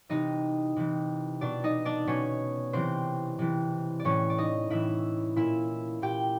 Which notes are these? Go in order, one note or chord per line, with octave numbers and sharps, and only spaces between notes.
C3 E3 D#4 D#5
C3 E3
B2 D4 D5
D#4 D#5
D4 D5
B2 C#4 C#5
C3 E3 C4 C5
C3 E3
D5
A2 E3 C#4 C#5
D5
D#4 D#5
A2 E3 E4 E5
A#2 E4 E5
A#2 G4 G5